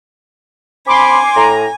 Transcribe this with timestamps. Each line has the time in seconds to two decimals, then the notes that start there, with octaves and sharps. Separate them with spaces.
0.87 C4 G#5 B5 C6 D6
1.36 A2 A#5